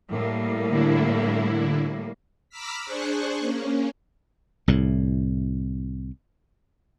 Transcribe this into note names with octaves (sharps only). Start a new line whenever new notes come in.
A2 G3 A#3
D3 E4
A#5 B5 D6 E6 F6 B6
D4 G#4 C5 C#6 F#6
A#3 C#4
C2 A2